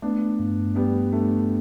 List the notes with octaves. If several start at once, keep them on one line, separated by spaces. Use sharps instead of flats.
A3 B3 D4
G2
G3 B3 D4
A3 D4